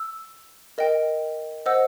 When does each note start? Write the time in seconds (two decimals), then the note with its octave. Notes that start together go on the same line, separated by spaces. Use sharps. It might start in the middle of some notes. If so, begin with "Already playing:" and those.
Already playing: E6
0.78 A#4 D#5 G5
1.66 C5 D#5 F#5 E6